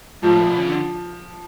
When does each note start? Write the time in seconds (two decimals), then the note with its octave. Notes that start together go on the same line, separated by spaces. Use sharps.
0.23 G#2 F3
0.32 A2
0.41 A#2
0.49 B2
0.58 C#3
0.68 D3